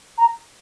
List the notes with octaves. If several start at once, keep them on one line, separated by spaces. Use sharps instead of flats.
A#5